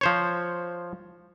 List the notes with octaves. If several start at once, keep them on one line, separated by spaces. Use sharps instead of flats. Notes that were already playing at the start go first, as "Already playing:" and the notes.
F3 C5 C#5